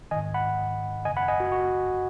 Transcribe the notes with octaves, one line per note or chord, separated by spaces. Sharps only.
G#2 D#3 D#5 G#5
F#5 B5
F#2 C#3 D#5 G#5
F#5 B5
D#5 G#5
F#4
F#4